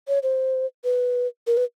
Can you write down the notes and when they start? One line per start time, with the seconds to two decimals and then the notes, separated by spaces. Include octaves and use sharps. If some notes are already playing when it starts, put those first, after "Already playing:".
0.08 C#5
0.23 C5
0.84 B4
1.47 A#4
1.57 B4